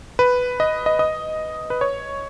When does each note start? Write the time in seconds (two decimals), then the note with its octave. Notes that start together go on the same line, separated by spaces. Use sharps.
0.19 B4
0.60 D#5
0.86 D#5
0.99 D#5
1.70 B4
1.81 C#5